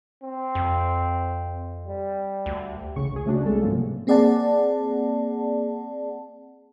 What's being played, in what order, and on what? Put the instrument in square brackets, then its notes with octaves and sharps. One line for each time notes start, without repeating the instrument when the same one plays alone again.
[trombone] C4
[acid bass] F2
[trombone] G3
[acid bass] D2
[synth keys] A1 C#3 C#6
C#2 G#4
C#3 A3 C#4 D4 F#4
C2 G#3 A4
G#2 C3 F3 F#3 A#3
[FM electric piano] A#3 C4 G#4 D5 F#5 A5